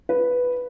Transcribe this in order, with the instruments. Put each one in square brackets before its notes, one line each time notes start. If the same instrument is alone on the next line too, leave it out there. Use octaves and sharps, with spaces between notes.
[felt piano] B4